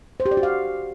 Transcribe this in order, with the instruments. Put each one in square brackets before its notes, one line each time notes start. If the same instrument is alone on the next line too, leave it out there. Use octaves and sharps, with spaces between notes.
[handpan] C5
G4
D5
F#4
F5